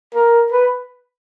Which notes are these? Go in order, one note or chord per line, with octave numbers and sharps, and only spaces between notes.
A#4
B4